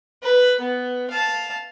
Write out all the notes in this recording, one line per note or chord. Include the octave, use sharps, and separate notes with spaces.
B4
B3
F5 A5